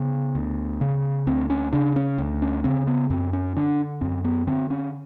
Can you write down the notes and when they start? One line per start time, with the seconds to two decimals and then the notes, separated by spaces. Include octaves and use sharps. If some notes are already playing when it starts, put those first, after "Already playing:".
Already playing: C#3 B3
0.35 D2
0.81 C#3
1.27 D2 C4
1.50 C#4
1.73 C#3 D4
1.96 C#4
2.18 D2
2.42 C#4
2.64 C#3 C4
2.87 B3
3.10 F#2 C4
3.33 C#4
3.56 D3 D4
4.01 F#2 C4
4.25 B3
4.47 D3 C4
4.70 C#4